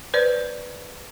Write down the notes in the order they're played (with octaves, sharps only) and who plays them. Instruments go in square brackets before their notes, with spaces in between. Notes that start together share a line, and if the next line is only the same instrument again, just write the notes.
[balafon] B4 C5 D5